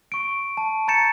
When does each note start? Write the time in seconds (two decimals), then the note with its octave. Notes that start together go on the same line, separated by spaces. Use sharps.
0.12 C#6 D7
0.57 A5
0.88 A#5 G6 A6 C#7 E7